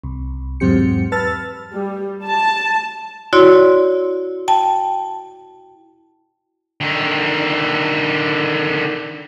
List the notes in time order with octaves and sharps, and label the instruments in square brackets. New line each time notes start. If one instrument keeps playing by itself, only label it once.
[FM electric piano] C2
E2 G#2 F#3 C4 G4 C#7
B4 A5 E6 F6 A6
[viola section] G3
A5
[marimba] E4 F#4 C#5 D5 C6
G5 A5
[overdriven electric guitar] D3 D#3